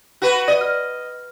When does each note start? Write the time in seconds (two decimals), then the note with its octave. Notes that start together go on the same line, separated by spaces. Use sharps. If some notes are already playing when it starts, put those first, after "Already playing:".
0.22 F#4 B4
0.48 D5 D#5
0.61 F6